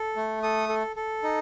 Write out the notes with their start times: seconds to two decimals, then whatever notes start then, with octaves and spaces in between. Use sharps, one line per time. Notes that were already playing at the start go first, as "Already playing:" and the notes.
Already playing: A4
0.16 A3
0.43 A4 D#6
0.69 A4
0.96 A4
1.23 D#4